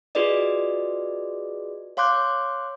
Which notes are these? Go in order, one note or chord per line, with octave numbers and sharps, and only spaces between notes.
F4 F#4 G#4 B4 D5 D#5
C#5 F5 C6 D6 F#6 G6